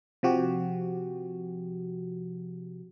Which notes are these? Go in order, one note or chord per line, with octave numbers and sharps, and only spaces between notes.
C3 F3 F#4 G4